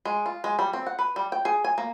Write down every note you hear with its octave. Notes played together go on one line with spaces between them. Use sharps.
G#3
F4
G#3
G3
C4
F#5
B4
G3
G5
G#4
G#5
A#3